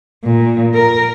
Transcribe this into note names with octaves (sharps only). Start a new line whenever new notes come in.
A#2
A#4